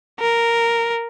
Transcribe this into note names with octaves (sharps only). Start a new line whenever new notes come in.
A#4